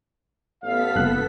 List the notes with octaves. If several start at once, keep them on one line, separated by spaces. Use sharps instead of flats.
A1 B3 A4 F5 B6
F#1 C2 F#6